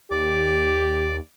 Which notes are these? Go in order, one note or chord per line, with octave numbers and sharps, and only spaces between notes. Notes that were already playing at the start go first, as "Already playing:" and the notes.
D#2 G4 D5 D6